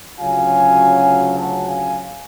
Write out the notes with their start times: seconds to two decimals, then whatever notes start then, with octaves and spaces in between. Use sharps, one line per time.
0.19 D2 C#3 F#3 C#4 F4 F5 G#5
1.38 F#5 A5
1.67 F5 G#5